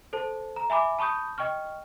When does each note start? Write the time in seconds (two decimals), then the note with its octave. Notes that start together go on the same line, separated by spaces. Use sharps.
0.13 A4 C5 A5
0.56 A#5
0.70 E5 G#5 B5 D6
0.99 A5 B5 C#6 D#6 G6
1.38 D#5 G5 C#6 F6